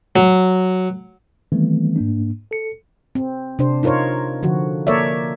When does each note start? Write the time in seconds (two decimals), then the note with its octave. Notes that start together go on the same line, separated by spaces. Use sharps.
0.16 F#3
1.52 D#3 E3 G3 A3 B3 C4
1.96 G#2 A#3 D4
2.51 A4 C#7
3.15 C4
3.59 C3 D4 C5
3.83 D#4 F4 A#4 C5 C#5
4.43 D3 F3 F#4
4.87 A#3 A4 A#4 C#5 D5 E5